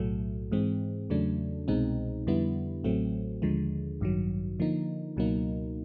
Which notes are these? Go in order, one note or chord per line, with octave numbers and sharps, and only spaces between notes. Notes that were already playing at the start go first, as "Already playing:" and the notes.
Already playing: B1 A2 F#3 A3
G#2 E3 G#3 C4
E2 C#3 F#3 A3 D4
C2 B2 G#3 C4 D#4
F2 D3 G3 B3 E4
A1 A2 F#3 A3 C4
D#2 D3 F3 G#3
A1 G2 D#3 F#3
D3 F3 A#3 D#4
C#2 B2 F#3 A#3 D#4